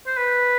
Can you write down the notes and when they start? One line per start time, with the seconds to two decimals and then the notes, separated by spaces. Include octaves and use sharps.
0.07 C5
0.17 B4